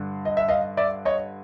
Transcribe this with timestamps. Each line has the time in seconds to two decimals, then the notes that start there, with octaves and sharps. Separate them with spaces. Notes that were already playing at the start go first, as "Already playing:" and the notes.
Already playing: G2 D3
0.25 D#5
0.37 E5
0.49 D#5 F5
0.77 D5 E5
1.05 C#5 D#5